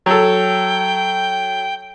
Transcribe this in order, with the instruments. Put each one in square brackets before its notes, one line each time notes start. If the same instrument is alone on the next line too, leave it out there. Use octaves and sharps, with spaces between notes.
[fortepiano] F#3 A4 [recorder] G5